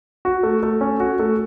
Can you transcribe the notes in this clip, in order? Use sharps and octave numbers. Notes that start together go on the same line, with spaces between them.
F#4
A3
A3
C#4
F#4
A3